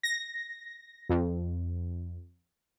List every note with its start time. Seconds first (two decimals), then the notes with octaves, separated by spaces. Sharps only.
0.03 A#6
1.09 F2